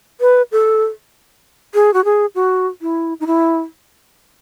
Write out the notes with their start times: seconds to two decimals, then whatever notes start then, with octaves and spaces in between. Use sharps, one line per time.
0.21 B4
0.52 A4
1.74 G#4
1.94 F#4
2.05 G#4
2.35 F#4
2.81 E4
3.20 D#4
3.27 E4